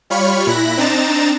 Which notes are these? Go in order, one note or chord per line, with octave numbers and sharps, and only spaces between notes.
G3 F4 C#5 B5 C#6 F6
A#2 E4 B5 F#6 A#6
C4 D4 D#4 A#5 A6 E7